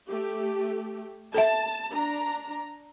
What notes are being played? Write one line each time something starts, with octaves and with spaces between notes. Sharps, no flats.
A3 G4
A4 E5 A5
D4 A#5